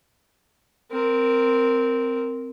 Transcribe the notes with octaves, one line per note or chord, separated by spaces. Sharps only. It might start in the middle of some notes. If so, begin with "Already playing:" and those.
C4 A#4